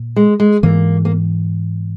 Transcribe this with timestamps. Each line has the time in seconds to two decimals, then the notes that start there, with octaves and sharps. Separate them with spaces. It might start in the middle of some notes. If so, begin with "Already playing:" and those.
Already playing: A#2
0.16 G#3
0.40 G#3
0.63 G#2 E3 G#3 A#3
1.05 A#3